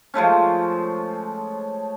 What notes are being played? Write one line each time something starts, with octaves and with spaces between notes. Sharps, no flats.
F3 G#3 A3 C#4